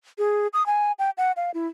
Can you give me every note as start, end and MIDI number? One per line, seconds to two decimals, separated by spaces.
0.18 0.47 68
0.53 0.65 87
0.66 0.92 80
0.99 1.10 79
1.18 1.32 78
1.37 1.51 77
1.54 1.68 64